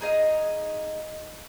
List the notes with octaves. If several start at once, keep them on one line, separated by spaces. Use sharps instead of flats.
D#4 G#4 D#5 F5